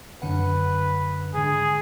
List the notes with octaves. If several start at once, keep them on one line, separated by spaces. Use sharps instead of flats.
F#2 D3 B4 F#5
G#2 D3 G#4